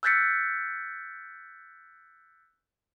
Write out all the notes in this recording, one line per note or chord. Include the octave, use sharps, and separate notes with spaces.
E6 F#6 G6 A6 B6 C#7